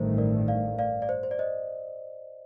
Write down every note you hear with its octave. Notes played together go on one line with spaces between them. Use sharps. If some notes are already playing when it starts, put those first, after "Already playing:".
Already playing: A1 G2 D#3 A3 C5
A#4 D5
D5 F5
D5 F5
D5
C5
C5
D5
C5 D#5